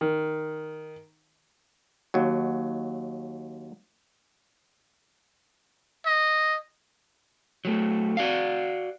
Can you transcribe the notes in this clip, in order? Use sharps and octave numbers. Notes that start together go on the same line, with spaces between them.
D#3
D#2 F#3
D#5
F#3 A3
F#4 D5 F5